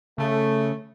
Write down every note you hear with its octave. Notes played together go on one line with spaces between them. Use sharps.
C#3 A3